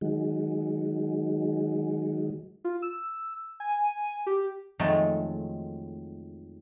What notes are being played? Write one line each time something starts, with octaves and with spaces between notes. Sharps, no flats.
D#3 F#3 G#3
F4
E6
G#5
G4
F2 D#3 F#3 G#3 A3